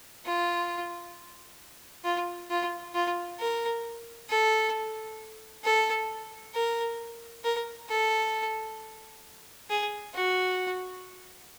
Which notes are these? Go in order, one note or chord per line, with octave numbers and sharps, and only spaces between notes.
F4
F4
F4
F4
A#4
A4
A4
A#4
A#4
A4
G#4
F#4